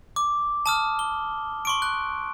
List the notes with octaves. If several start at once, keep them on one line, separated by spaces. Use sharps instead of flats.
D6
A5 D#6 F6
G7
C6 C#6 D7
F#6